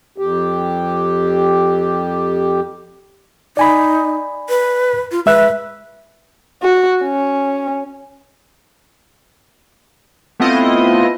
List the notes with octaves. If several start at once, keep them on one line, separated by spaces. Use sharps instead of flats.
F2 G4
D#4 D5 G#5 B5
B4
F4
G#3 B4 E5 F#6
F#4
C#4
A3 B3 C4 E4 F4 D#5